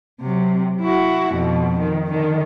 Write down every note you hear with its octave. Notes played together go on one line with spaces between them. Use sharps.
C3 F#3
E4 F#4
F2 B2
D#3
D3 D#3